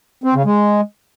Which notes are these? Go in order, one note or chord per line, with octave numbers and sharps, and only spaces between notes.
C4
C#3
G#3